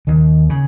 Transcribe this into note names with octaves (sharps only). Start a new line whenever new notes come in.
D#2 D#3
C#3